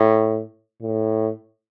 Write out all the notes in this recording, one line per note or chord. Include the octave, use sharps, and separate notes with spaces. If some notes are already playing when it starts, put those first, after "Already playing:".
Already playing: A2
A2